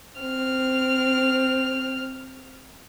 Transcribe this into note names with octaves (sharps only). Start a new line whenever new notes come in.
C4 F6